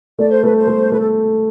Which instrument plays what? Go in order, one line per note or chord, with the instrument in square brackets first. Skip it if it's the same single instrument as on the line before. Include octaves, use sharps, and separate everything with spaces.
[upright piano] A3 [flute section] D5
[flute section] C5
[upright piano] A3 [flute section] B4
[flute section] C5
[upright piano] A3
[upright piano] A3 [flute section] B4
[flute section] A4